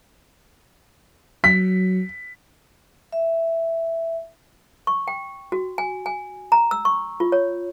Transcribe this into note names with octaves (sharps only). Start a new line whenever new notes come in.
F#3 B6
E5
C#6
G5
F#4
G#5
G#5
A#5
E6
C#6
F4
C#5